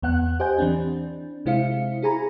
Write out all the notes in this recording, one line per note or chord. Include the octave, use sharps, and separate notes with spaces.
E2 B3 F#5 F#6
G4 C5 D#5 G#5 G6
E3 C4 D4
C3 G#3 E4 C5 F5 C#7
E4 G#4 G#5 A#5 B5